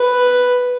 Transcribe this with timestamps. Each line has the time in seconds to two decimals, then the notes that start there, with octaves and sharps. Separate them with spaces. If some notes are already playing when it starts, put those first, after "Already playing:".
Already playing: B4